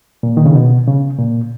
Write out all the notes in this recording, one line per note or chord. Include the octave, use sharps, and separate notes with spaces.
A#2
D#3
C#3
B2
C#3
A#2